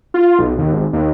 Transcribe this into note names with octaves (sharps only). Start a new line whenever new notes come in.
F4
B1
D#2
G#1
D#2